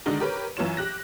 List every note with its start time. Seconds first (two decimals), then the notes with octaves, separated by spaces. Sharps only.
0.06 D3 D#3 G#3 D4 D#4 F#4
0.20 G4 A#4 B4 C#5
0.57 F#2 E3 F4 C#5 E7
0.77 G4 F#6 A#6